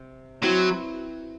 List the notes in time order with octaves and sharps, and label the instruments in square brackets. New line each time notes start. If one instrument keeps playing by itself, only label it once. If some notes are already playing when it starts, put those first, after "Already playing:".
Already playing: [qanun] C3
[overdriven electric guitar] F#3 [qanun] C4 E4 B4